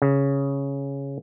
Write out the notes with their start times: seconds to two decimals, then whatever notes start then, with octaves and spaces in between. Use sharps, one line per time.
0.02 C#3